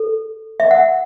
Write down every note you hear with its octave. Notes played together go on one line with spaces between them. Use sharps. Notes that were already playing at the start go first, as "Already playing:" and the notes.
Already playing: A4
E5
F#5